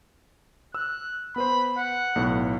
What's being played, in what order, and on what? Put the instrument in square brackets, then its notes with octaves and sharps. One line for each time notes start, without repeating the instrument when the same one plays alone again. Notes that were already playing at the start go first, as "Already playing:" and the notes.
[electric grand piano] E6 [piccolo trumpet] F#6
[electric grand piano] B3 B4 C5 [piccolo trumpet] B5
[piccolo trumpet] F#5
[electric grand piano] B1 A2 B3